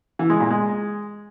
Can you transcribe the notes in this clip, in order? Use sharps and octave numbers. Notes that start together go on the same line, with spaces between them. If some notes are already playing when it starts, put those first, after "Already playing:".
E3
G#3
A#2
G#3